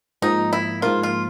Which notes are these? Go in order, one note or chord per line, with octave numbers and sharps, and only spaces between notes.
G#2 F3 A#3 D#4
E4
G#2 F3 A#3 F4
F4